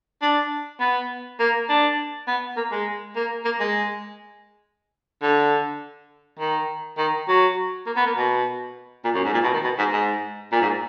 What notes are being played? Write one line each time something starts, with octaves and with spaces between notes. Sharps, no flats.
D4
B3
A#3
D4
B3
A#3
G#3
A#3
A#3
G#3
D3
D#3
D#3
F#3
A#3
B3
A#3
B2
A#2
F#2
G#2
A#2
B2
D#3
B2
G#2
G#2
A#2
G#2